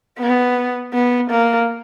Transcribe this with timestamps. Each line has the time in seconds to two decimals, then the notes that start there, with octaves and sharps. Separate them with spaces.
0.19 B3
0.93 B3
1.31 A#3